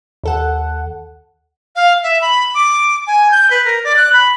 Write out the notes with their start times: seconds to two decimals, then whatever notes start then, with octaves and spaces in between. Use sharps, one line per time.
0.24 D#2 A4 F#5
1.76 F5
2.03 E5
2.21 B5
2.55 D6
3.07 G#5
3.31 G6
3.51 B4
3.65 A#4
3.84 D5
3.97 F#6
4.13 B5